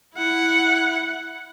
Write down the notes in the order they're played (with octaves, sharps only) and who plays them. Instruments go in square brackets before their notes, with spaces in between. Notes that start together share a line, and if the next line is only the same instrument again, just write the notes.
[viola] E4 F#5